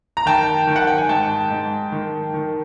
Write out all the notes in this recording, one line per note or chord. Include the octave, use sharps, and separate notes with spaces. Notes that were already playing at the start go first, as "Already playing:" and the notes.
A#5
D#3 G5 A5
D#3
F#5
G5
G#5
G#2 G5 A5
G#2
D#3
D#3